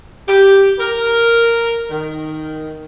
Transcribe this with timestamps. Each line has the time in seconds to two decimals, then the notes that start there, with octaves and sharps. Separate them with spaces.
0.28 G4
0.79 A#4
1.90 D#3